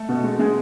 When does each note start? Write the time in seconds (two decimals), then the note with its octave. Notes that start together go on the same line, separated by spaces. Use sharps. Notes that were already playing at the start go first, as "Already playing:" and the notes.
Already playing: A3 A4
0.09 B2
0.24 G#3
0.39 G#3 G#4